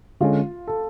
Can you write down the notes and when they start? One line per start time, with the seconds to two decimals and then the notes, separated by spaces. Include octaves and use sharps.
0.21 D3 G#3 C#4 F4
0.67 A4